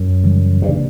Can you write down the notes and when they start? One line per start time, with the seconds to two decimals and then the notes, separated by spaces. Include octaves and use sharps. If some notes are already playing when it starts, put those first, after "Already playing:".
Already playing: F#2
0.24 C#3 E3 G3
0.62 G2
0.69 C#3 E3 A#3 D4